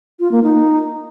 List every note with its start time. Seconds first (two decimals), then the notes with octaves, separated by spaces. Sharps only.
0.20 F4
0.31 A#3
0.43 D#4